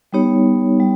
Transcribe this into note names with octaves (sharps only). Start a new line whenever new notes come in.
G3 B3 D#4 G4 C#5
G3